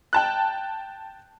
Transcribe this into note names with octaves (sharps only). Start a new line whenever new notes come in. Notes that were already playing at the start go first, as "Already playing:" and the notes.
G5 A5 F#6